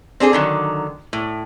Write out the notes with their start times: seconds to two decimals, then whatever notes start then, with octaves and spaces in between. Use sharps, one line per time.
0.20 C4 D4 G#4 A4
0.33 D3 D#3 F#3
1.13 A2